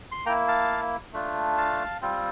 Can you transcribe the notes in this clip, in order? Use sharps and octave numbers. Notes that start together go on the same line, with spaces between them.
C6
A#3 E4 G5 A#5
F5 A5
A3 D4 F4
F5 A5
G3 C4 F4